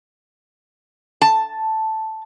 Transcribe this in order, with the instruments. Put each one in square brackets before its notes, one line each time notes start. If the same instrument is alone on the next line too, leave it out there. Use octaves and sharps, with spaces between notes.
[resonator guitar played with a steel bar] A5